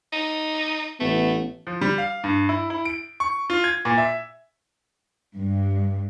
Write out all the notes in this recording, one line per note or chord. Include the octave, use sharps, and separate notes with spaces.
D#4
A1 A3 B3
F3
G3
F5
G2
E4
E4
D7
C#6
F4
G#6
A#2
E5
G2